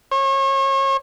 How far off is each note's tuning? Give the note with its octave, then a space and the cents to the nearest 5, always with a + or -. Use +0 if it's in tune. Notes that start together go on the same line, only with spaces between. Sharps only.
C#5 -35